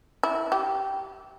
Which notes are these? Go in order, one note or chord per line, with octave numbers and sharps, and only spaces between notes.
E4
G4